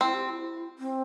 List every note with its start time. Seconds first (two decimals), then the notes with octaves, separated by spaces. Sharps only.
0.01 C4 E4
0.14 G4
0.26 G4
0.29 E4
0.79 C4